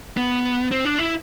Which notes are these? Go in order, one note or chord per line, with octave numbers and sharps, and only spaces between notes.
B3
C4
D4
E4